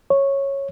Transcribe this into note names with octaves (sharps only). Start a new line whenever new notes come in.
C#5